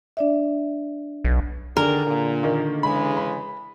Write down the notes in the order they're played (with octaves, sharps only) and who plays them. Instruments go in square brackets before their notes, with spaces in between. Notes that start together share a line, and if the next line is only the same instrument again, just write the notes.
[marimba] D4 D5 E5
[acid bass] B1
[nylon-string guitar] D3 G#4 [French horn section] D#3 D4 [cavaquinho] A#4
[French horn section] A#2
[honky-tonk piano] D#3 A#3
[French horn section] C#3 E3 G#3 [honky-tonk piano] B5
[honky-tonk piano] B5